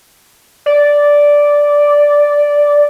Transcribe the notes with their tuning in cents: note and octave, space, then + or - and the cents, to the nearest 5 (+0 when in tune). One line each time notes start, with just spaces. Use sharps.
D5 -5